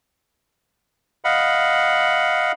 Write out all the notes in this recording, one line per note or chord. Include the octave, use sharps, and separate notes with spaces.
D#5 F5 F#5 B5